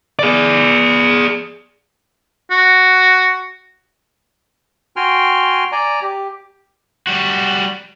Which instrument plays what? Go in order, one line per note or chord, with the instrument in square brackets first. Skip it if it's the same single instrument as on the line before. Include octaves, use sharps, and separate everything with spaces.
[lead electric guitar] G#4 D5
[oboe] F#4
[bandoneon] F#4 G5 G#5 C6 F6
D5 G#5 A#5
G4
[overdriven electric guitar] G3 F#4